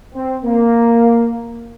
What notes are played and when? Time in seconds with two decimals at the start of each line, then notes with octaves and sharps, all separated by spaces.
0.14 C4
0.44 A#3